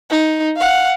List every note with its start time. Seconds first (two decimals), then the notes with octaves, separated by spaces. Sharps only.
0.10 D#4
0.56 F5 F#5